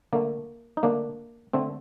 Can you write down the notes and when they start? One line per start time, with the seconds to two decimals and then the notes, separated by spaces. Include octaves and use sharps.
0.13 D3 A3 A#3
0.77 D#4
0.83 D3 A3 A#3 D4
1.53 D3 A3 C4